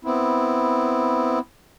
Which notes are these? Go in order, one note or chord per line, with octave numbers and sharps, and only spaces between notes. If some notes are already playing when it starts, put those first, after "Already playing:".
B3 C4 E4